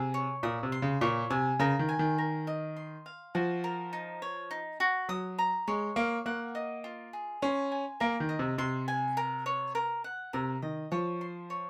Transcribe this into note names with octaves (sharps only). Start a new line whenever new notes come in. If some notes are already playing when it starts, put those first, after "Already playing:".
Already playing: C3 G#4
C#5
A#2 D#6
C3
C6
C#3
A#2 C#5
C3 G#5
C#3 A#4
D#3
G#5
D#3
A#4
D#5
C6
F5
F3 F#4
A#4
D#4
C#5
D#4
F#4
F#3 D#6
A#5
G#3 C#5
A#3 F5
A#3 F#5
D#5
F4
G#4
C#4 C6
G#5
A#3 A#4
D#3
D#5
C3
C3 C6
G#5
A#4
C#5
A#4
F#5
C3 A#4
D#3 D#5
F3 C#5
C6
C#5